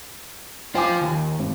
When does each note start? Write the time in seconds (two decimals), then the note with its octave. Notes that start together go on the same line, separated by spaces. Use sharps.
0.75 F4 C5 G5 G#5 D6
1.01 D#2
1.39 G#1